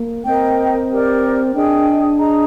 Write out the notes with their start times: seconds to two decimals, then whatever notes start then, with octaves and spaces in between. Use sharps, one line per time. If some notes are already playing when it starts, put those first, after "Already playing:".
Already playing: A#3
0.26 C4 A#4 D#5 G5
0.90 G4 A#4 D5
1.54 D4 G#4 D#5 G5
2.19 G#4 D#5 A#5